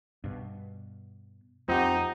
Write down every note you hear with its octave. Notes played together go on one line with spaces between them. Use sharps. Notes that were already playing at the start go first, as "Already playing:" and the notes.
G2 B2
F2 C4 D#4 F4 G4 F#5